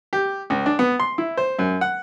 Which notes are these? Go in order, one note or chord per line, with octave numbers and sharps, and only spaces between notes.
G4
C#2
D4
B3
C6
E4
C5
F#2
F#5